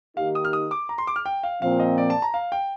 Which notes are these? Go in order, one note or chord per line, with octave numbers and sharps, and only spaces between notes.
D#3 A#3 D#4 G4 F5
D#6
F6
D#6
D6
A#5
C6
D6
F6
G5
F5
A#2 F3 C4 F5
D#5
D5
A5
A#5
F5
G5